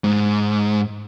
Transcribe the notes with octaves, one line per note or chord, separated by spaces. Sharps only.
G#2